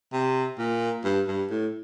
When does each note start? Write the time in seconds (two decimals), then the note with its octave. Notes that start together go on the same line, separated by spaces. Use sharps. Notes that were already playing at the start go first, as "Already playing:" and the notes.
0.13 C3
0.59 A#2
1.04 G2
1.28 G2
1.50 A2